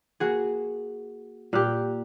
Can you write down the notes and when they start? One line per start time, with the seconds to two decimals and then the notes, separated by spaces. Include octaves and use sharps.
0.20 A#3 F#4 G#4
1.53 A#2 G4 F6 F#6